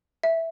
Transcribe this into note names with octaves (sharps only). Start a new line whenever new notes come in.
E5